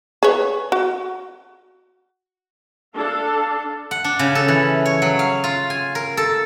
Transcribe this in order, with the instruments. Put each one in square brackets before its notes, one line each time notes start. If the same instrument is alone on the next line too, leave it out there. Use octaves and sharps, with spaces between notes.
[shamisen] G#4 B4 C#5
F#4
[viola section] D4 A4 F5 A5
[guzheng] F#5
D4
C#3
A4
E3
C#5
F#3
F5
F4
G#5
A#4
A4